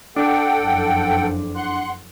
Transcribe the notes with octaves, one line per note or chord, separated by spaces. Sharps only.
D4 A4 F#5 G5
F#1 F2
F#5 C6 F#6